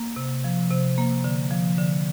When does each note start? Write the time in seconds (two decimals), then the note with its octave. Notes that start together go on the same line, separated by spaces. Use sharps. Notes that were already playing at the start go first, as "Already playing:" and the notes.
Already playing: A#3
0.16 C3
0.44 F3
0.71 C3
0.98 A#3
1.24 D3
1.51 F3
1.78 D3